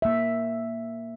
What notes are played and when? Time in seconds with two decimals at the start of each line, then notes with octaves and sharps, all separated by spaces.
0.02 A#3 E5